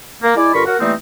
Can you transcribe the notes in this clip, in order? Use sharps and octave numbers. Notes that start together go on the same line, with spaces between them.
A#3
G#3 E4 D5
G2 D3 F4 A#4 B5 C#6
F#4 A#4 F#5
E3 G3 A3 A#3 C4 D#4